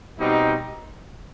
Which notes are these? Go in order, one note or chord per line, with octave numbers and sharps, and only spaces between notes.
B2 G3 C4 D#4